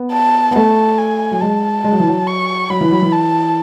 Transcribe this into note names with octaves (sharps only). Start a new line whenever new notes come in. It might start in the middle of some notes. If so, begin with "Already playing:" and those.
Already playing: B3
A5
B3
A3 A5
G#5
F#3
G#3 A5
G#3
F#3
E3
F#3
C#6
F#3 B5
E3
F#3
E3
A5